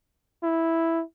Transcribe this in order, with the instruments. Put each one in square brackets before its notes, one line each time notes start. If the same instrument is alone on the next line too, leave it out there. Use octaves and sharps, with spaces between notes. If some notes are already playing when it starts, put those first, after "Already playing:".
[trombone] E4